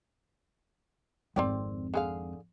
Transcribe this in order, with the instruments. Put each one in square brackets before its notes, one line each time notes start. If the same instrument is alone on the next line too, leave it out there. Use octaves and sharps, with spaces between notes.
[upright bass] G#1 F2 [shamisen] C4 D5 G5
[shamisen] D3 G#4 F5